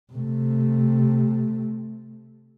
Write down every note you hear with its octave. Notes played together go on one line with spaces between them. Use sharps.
C3 A3